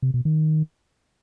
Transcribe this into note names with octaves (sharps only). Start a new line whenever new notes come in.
C3
B2
D#3